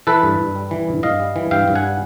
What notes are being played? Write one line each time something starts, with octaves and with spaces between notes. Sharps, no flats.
E3 A4 B4
G2
G2
G3
E3
G2
G2 D#5 F5
G3
E3
G2 F5 G5
G2
F#5 G#5
G3